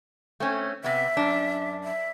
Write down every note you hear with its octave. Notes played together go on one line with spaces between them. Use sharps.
A3 C4 C#4
C3 B3 E5
F#2 D4
E5